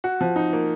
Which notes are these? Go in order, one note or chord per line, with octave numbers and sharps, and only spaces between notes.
F#4
F3
D#4
A#3